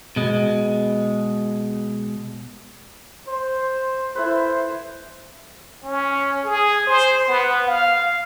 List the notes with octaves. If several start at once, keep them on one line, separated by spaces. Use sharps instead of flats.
B2 G#3
C5
E4 A4 B4 C5
C#4
G#4
C5
B3
F5